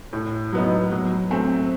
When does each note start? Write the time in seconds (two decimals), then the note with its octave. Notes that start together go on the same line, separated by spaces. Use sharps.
0.13 A2
0.53 F#3 B3 D#4
0.92 F#3
1.31 A3 C4